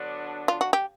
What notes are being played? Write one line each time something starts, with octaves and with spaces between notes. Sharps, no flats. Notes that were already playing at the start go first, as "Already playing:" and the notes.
Already playing: D3 F#3 B3 D4
F4
F#4
G4